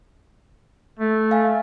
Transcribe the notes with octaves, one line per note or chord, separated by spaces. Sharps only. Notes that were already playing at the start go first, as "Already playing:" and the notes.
A3
F5 G#5